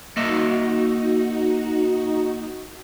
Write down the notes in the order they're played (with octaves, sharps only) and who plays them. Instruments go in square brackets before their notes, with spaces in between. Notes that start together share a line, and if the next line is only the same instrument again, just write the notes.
[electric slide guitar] A#3 D#5 E5 [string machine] D#4 F#4